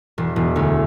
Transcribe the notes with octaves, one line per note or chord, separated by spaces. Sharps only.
E1
E1
D2